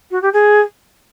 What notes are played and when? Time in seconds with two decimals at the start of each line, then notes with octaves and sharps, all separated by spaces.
0.11 F#4
0.22 G4
0.33 G#4